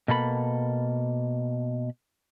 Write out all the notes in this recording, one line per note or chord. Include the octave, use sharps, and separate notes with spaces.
B2 A#3 A4 B5